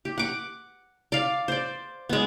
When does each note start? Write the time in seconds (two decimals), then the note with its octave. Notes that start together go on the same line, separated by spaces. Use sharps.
0.05 G4
0.18 F#5 D6
1.12 D5 F5
1.48 C5 D5
2.09 G#3 B3